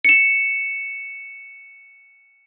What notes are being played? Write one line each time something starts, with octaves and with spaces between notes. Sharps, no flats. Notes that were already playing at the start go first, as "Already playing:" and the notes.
C#7 E7